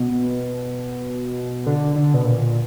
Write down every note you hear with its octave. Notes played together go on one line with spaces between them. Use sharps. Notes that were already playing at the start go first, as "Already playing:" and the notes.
Already playing: B2
D3
D3
B2
A#2